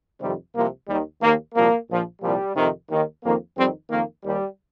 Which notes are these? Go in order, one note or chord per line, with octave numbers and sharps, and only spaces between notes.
F2 C3 D#3 G3 C4
C2 C3 F3 A#3
D#2 D#3 G3
D#2 D#3 A#3
C2 A#2 F3 A#3
A#1 A#2 F3
C2 A#2 F3 G3
F2 C3 D#3
D#2 D#3
F2 D#3 A#3
F2 D#3 G3 C4
F2 D#3 A#3
D#2 D#3 G3